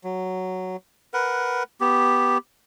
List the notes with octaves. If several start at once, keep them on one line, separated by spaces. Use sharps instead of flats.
F#3
A#4 B4 F#5
B3 G4